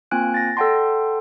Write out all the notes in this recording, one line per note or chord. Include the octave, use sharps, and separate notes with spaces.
A#3 C4 F4 G#5 F#6 D7
A6 A#6
A4 D5 F#5 G5 A5 C6